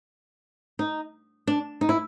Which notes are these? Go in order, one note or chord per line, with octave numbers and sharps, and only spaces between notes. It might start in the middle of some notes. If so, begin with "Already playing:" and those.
D#4
D4
D#4
E4